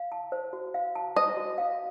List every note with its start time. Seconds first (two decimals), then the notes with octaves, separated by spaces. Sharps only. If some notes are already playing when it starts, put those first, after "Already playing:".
Already playing: F5
0.12 A5
0.32 C5
0.53 F#4
0.74 F5
0.95 A5
1.16 C5 D#5
1.37 F#4
1.58 F5